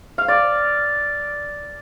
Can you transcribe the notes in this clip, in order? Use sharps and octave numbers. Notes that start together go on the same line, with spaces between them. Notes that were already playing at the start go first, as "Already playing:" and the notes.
F5
D5